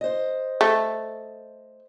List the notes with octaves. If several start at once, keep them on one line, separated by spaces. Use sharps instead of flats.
C5 D#5
A3